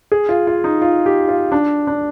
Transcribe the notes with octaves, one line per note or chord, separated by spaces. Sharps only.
G#4
F4
F4
D#4
F4
G4
F4
D4
D4